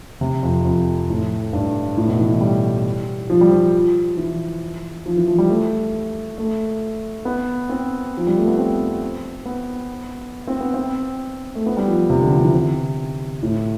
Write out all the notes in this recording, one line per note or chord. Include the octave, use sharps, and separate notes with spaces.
C3
F2
F2
A2
G2
A2
B2
E3
G3
F3
G3
F3
E3
F3
E3
F3
G3
A3
A3
B3
C4
F3
G3
A3
B3
C4
B3
C4
B3
C4
A3
B3
G3
F3
C3
D3
F3
D3
E3
C3
A2